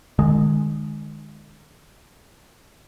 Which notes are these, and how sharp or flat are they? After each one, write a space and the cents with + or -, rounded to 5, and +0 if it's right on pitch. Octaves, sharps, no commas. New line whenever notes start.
D#3 -40 G#3 +0